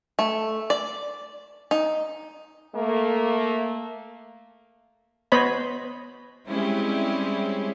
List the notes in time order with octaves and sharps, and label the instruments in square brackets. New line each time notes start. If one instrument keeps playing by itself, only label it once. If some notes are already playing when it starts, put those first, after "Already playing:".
[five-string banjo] A3
D5
D#4
[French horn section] A3 A#3
[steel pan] B3 C5 C#5 D#5 B5
[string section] G3 G#3 C4 C#4 E4 G4